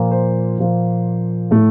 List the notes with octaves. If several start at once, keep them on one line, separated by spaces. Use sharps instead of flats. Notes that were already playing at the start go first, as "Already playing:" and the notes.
Already playing: A#2 F3 A#3
C5
A#2 F3 A#3
A2 A3